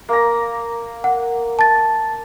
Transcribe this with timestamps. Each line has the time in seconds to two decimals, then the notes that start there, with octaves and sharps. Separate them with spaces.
0.09 A#3 A#5
1.04 F#5
1.59 A5 A6